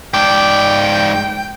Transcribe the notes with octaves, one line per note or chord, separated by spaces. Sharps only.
G#2 D5 G5